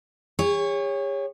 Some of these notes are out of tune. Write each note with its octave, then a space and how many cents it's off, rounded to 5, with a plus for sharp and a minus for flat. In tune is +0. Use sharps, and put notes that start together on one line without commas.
G#4 -45 C#5 +0